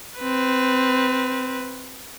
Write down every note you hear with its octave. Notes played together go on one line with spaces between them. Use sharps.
C4 B4